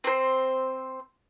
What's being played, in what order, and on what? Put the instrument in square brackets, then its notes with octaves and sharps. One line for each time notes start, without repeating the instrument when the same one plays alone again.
[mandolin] C4 C5